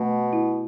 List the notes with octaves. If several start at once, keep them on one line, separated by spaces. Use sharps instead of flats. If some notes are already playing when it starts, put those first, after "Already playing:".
Already playing: B2 A3
E4